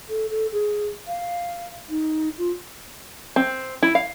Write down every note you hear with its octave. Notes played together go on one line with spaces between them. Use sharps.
A4
A4
G#4
F5
D#4
F4
C4
E4
F5